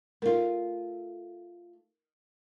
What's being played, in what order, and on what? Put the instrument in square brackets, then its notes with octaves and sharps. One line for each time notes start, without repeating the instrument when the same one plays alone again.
[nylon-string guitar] A3 F4 [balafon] A#4